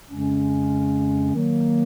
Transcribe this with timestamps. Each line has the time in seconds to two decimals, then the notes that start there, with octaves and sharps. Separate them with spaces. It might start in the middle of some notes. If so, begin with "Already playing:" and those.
0.06 F2 C#3 G#3 C#4
1.34 D#3 F#3 A#3